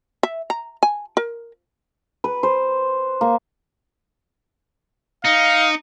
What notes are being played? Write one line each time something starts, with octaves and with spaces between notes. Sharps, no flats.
E5
A#5
G#5
A#4
B4
C5
A#3
D#4 F5 C#7